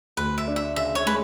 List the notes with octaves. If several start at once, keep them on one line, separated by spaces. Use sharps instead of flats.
D2 B4
E5
D4
E5
C#3 E5
C#5
G#3 B4